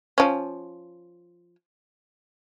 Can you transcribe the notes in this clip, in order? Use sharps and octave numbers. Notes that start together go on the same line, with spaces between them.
F3 C#4